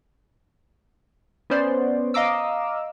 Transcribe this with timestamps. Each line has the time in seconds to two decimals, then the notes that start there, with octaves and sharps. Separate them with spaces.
1.50 B3 C#4 C5 D5
2.14 D#5 F5 A#5 D6 E6